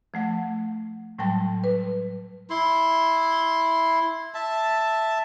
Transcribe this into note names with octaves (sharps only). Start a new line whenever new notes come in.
F3 A3 F#5
A2 F#3 G3 G5 A5 C6
B4
E4 C6
E5 A5